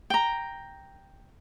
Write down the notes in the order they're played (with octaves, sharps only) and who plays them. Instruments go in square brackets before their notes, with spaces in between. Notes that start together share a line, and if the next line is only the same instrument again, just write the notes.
[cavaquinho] G5 A#5